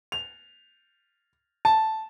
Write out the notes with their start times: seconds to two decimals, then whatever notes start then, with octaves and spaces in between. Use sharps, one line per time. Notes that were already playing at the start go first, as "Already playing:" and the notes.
0.12 F7
1.65 A5